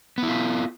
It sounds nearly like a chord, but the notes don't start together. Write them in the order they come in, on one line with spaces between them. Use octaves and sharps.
B3 E4 F4